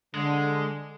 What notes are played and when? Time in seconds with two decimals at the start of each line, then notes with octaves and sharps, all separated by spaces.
0.15 D3 G#3